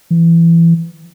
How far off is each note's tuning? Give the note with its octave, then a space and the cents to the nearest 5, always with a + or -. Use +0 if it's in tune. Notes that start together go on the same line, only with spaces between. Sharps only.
E3 +20